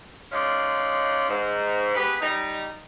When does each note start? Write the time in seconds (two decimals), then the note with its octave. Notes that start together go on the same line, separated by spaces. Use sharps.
0.31 G#3 C#4 D#4 F4 D5
1.28 G#2
1.94 B3 G4 G#4 B4
2.21 G3 D#4